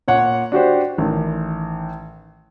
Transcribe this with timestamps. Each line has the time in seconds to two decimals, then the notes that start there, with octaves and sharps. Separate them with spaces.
0.08 A#2 C#5 F#5
0.52 D4 F#4 G4 C5
0.98 A1 D#3